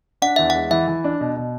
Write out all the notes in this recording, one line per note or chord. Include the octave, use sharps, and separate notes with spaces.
D4 F#5
E2 E5
F#5
G#3
E3 E5
E3
D4
B2
B2